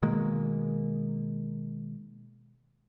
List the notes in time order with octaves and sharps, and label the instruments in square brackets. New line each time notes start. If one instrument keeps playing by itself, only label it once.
[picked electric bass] B2 D#3 G#3 A#3